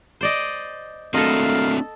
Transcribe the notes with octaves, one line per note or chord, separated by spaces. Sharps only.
C5 D5 D#5
A3 C4 D4 F#4 A4 A#4 D#5 F5